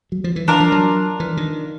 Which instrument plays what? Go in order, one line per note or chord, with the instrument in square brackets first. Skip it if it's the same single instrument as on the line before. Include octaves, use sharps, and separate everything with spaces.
[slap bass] F#3
F3
E3
[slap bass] E3 [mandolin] D4 F4 A#4
[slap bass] F3
F#3
E3
D#3